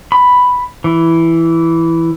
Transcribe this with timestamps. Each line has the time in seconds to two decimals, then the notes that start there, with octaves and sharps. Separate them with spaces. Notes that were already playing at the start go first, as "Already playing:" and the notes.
0.12 B5
0.84 E3